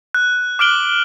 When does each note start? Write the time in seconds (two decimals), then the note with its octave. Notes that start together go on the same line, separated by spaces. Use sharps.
0.14 F#6
0.59 D6 F6 F#6 D7 F#7 G7